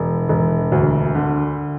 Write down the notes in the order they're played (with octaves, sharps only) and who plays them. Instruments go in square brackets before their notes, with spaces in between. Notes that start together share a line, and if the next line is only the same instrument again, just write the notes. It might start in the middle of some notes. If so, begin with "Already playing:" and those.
Already playing: [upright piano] E1
E1
D2
D3